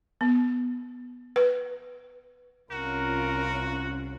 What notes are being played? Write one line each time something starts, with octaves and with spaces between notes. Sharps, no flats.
B3
B4
C2 C#4 F4 F#4 A#4